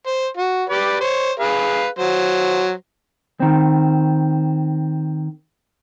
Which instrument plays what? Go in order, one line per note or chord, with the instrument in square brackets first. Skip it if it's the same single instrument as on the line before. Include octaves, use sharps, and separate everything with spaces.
[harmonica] C5
F#4
G4 B4 D5
C5 C#5
G#4 B4 F5
F#3 C5
[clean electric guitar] D#3 C4